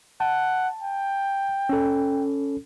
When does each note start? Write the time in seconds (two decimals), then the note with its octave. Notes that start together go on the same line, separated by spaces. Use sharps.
0.20 F#5 A5
0.82 G5
1.69 C#4 A4